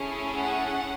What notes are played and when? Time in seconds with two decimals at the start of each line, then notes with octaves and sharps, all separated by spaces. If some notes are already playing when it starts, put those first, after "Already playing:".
Already playing: A3 C#4 E4 G#4
0.39 F#5